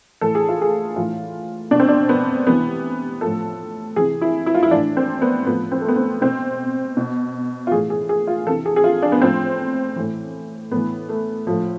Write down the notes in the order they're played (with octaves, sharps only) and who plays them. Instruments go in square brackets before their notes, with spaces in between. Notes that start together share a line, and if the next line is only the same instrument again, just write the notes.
[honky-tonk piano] A2 E3 A4
G#4
F4
G#4
A2 E3 F4
B2 D4
C4
D4
B3
C3 E3 B3
A2 F3 A4
C3 E3 G#4
E4
E4
F4
E4
A2 E3 D4
C4
B3
A2 F3 B3
C4
A3
B3
C4
B2 C4
B2
F4
A2 E3 G#4
G#4
G#4
F4
C3 E3 A4
G#4
G#4
F4
D4
B3
A2 F3 C4
A2 E3
A2 E3 B3
A3
A2 F3